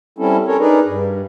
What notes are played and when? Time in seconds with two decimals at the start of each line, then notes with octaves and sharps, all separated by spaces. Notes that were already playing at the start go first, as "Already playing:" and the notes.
0.18 G3 C4 C#4 E4 A4
0.47 C#4 A4 A#4 C#5
0.60 D4 D#4 G#4 A#4 B4 D5
0.86 G2